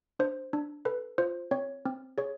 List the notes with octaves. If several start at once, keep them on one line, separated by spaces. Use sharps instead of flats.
D4 C5
D4
A4 B4
F4 C5
C4 C#5
C4
G#4 C#5